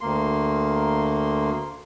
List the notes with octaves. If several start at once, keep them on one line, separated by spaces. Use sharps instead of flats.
D2 A#3 C6